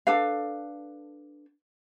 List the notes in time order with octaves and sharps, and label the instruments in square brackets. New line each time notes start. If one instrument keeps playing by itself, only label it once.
[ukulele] D4 A4 B4 F5